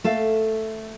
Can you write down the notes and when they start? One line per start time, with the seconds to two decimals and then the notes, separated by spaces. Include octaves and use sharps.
0.04 A3 A4 F5